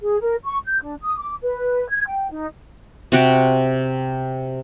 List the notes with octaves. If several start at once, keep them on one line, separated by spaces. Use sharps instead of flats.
G#4
A#4
C#6
G6
D4
D#6
D6
B4
G#6
G5
D#4
C3 F#4 G4